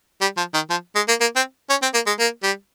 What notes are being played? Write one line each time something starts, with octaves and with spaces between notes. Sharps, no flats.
G3
F3
D#3
F3
G#3
A#3
A#3
C4
C#4
C4
A#3
G#3
A#3
G3